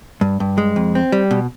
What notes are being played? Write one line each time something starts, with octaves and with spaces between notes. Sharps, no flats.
G2
G2
G#3
F2
C4
G3
B2